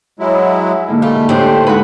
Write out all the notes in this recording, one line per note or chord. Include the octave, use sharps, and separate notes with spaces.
F#3 G#3 E4
G#2 D3 A#3
G3 A3 F4
A2 D4 G4 C5
G#3 D4 D#4 F#4 B4